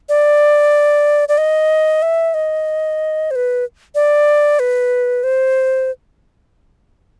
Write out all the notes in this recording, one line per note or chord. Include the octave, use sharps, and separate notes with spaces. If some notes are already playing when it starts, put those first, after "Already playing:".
D5
D5
D#5
E5
D#5
C5
B4
D5
B4
C5